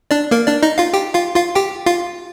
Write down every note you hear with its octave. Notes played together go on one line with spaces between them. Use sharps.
D4 D5
A#3 A#4
D4 D5
D#4 D#5
F4 F5
G4 G5
F4 F5
F4 F5
G4 G5
F4 F5